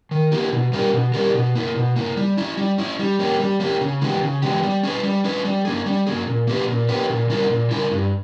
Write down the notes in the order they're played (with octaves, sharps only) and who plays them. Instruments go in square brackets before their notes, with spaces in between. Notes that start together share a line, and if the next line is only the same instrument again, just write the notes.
[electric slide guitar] D#3
A#3 E4 G4
B2
G3 C#4 G4 A#4
B2
G3 C#4 G4 A#4
B2
A#3 E4
B2
A#3 E4
G3
C#4 E4
G3
C#4 E4
G3
A#3 C#4 G4
G3
A#3 C#4 G4
C#3
E3 G#3 B3 G4
C#3
E3 G#3 B3 G4
G3
C#4 G#4 B4
G3
C#4 G#4 B4
G3
A#3 C#4 G#4
G3
A#3 C#4 G#4
A#2
A#3 C#4 G4 B4
A#2
A#3 C#4 G4 B4
A#2
G3 C#4 E4 A#4
A#2
G3 C#4 E4 A#4
G2